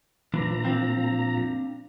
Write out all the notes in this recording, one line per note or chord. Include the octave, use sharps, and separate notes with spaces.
A#2 E3 F3 D4 A#5
C4 D4 F5